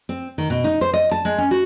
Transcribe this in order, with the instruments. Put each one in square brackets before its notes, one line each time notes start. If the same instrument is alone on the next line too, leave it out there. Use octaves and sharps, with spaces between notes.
[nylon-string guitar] C4
D#3
B2
D#4
C5
D#5
A5
G#3
C#4
F#4